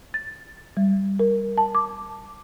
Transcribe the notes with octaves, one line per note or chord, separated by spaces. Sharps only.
A6
G3
A#4
A5
D6